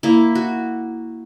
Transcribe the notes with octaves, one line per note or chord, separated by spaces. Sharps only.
A#3 E4
F#4